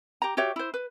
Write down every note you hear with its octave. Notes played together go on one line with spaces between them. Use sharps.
G4 A#5
F#4 G4 C#5 E5
E4 C5
B4